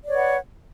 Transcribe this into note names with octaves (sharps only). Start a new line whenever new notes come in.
B4 C#5 D5 F#5